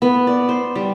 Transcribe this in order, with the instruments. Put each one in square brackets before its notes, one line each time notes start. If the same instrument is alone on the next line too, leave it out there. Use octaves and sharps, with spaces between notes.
[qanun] B3
D5
C5
G3